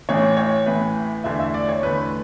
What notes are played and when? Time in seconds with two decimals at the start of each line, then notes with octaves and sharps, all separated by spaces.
0.09 A1 A2 E3 C#5
0.37 C#5
0.66 A1 A2 E3 B4
1.24 E2 D3 A3 E5
1.39 E5
1.54 D5
1.69 C#5
1.83 E2 D3 A3 B4